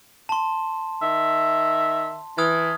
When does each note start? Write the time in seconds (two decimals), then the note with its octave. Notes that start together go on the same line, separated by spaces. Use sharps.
0.29 A5 C6
1.03 D#3 E5
2.38 E3 D#6 F6 G#6